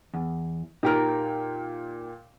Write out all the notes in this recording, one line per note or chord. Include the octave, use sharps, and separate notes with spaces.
E2
A#2 D#4 G4 A#4 G5 F6